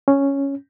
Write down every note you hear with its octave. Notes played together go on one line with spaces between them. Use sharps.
C#4